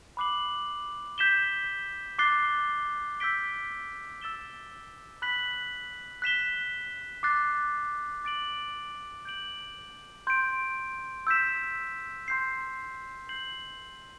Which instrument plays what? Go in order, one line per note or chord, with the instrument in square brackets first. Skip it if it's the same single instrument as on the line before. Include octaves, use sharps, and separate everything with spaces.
[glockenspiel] B5 D6 F#6 C7 F#7
G6 B6 E7 G7
D6 F#6 A6 C7 G7
E6 G6 B6 D7 G7
E6 A6 E7 G7
B5 F#6 B6 F#7
F#6 B6 E7 G7
D6 F#6 A6 C7
D6 A6 D7 F#7
G6 D7 F#7
C6 G6 D7
E6 G6 B6 E7
C6 G6 C7
G6 C7 F#7